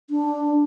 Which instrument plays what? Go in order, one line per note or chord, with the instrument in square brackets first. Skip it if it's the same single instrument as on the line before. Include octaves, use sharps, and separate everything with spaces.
[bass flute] D4